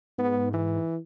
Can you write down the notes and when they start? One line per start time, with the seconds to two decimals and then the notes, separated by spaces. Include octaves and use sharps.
0.18 G#2 B3
0.53 E3